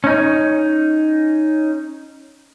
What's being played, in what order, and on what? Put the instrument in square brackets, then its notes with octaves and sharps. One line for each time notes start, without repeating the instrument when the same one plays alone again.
[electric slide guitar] C#4 D#4